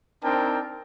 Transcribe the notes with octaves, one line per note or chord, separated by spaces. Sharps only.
C4 D4 D#4 A#4 G5 A5